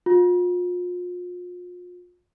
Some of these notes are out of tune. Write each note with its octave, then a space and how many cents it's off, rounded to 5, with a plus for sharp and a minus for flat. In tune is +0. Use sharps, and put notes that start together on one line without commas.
F4 +35